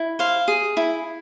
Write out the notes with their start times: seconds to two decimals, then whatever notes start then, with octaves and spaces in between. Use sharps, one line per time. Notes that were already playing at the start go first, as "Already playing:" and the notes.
Already playing: E4
0.19 C5 F5
0.48 G#4
0.77 E4